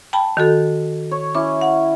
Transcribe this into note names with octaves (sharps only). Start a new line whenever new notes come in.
G5 A5 B5
D#3 F#4 A4
C#5
C#4 E4 D6
F#5